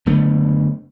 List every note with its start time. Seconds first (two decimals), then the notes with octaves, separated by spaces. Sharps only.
0.06 F#1 D3 A3 B3